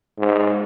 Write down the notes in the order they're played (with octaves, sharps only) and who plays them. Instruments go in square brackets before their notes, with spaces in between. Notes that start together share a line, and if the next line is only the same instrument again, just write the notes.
[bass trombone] G#2